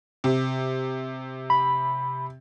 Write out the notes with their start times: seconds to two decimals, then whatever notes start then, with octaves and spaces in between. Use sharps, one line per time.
0.24 C3
1.50 B5